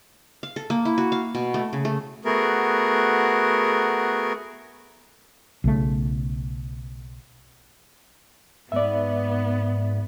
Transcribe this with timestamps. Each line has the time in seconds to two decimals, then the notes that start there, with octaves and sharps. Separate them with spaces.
0.43 F5
0.56 A4
0.70 A#3
0.85 E4
0.98 F#4
1.12 F5
1.35 B2
1.54 A3
1.73 C#3
1.85 A3
2.25 A3 B3 F#4 G#4 A#4
5.64 B1 C#3 A3
8.72 G#2 B3 D5 E5